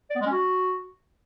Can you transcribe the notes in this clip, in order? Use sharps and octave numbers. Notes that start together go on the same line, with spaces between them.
D5
B3
G#3
C#4
F#4